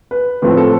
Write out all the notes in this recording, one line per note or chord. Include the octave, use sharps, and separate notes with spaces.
B4
A2 F3 A3 C4 B4
A4